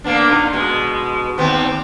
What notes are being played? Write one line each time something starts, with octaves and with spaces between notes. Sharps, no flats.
A#3 B3 D4
A#2 D#4
B2 G#3
D#2 B3 C4